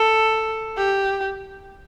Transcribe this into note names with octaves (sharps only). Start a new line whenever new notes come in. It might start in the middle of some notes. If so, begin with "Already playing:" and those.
Already playing: A4
G4